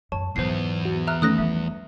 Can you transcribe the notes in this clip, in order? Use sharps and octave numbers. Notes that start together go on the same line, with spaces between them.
F#2 C#5 A5
E2 G#2 F#3 B3 C5 C7
F#4
E5 A#5 F6 F#6
D#3 A3 C#4 D#6 F#6 A#6
F3 G3 E5